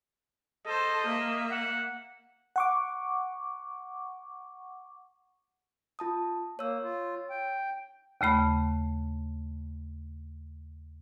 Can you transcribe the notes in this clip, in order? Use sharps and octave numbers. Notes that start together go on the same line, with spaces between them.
A4 C5 D#5
A#3 E5
F#5
F#5 C#6 D6
F4 A5 D#6
A#3 C#5 E6
F4
G5
D#2 C#3 A3 B5